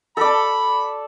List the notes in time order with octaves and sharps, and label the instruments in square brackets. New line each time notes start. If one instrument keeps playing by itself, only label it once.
[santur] A4 D5 [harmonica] B5